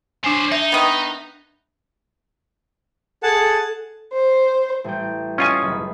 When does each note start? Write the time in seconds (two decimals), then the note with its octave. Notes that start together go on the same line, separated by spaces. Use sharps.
0.24 F#3 D4 C5 G#5
0.52 D#4 E5
0.72 D#3 B3
3.23 G#4 A4 F#5 A5
4.13 C5
4.84 A1 G3 G5
5.38 C#4 F4 D#5 G#5 E7
5.62 F#1 B5